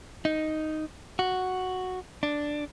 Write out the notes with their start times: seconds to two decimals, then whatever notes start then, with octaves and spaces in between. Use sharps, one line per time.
0.25 D#4
1.19 F#4
2.23 D4